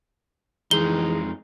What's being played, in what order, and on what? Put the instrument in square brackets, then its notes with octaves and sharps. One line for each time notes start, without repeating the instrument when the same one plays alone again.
[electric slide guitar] F2 G#3 D#4 [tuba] E3 [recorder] G#4 [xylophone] G7